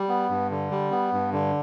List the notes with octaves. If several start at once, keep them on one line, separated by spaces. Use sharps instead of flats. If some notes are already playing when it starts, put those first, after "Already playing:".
Already playing: G3
B3
G2
D3
G3
B3
G2
D3